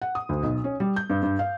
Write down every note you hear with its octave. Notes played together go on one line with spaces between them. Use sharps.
F#5
D#6
D2
B1
C#4
G3
G6
G2
G2
F5